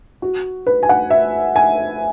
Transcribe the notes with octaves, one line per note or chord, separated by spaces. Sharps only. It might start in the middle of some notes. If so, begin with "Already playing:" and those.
F#4
B4
G#5
F#5
E5
G#5